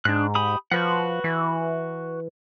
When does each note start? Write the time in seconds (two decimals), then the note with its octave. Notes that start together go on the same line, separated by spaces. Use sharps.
0.05 G#2 D4 F#6
0.35 G4 B5 D#6
0.71 F3 F#4 B4 F#5
1.24 E3